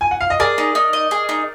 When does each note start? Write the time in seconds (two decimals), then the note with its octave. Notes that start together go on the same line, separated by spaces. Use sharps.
0.01 G#5
0.11 F#5
0.21 F5
0.30 D#5
0.39 G#4 A#4 D5
0.58 D#4
0.75 D#4
0.93 D#5
1.11 G#4
1.29 D#4